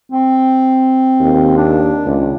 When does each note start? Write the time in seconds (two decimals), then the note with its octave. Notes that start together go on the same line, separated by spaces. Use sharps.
0.12 C4
1.20 D#2
1.57 D4
2.06 C#2